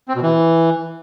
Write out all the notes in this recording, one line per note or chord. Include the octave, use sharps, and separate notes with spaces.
C4
B2
E3